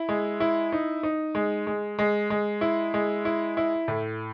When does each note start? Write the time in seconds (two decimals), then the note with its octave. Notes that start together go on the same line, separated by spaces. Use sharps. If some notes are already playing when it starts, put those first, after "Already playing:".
Already playing: E4
0.09 G#3
0.40 E4
0.72 D#4
1.03 D#4
1.35 G#3
1.67 G#3
1.99 G#3
2.30 G#3
2.61 E4
2.94 G#3
3.25 E4
3.57 E4
3.88 A2